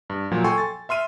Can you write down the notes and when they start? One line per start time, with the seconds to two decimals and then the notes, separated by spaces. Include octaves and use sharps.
0.10 G2
0.31 A#2 F3 F#3
0.44 A4 G5 G#5 C6 C#6
0.58 A6
0.89 E5 C6 F6 D#7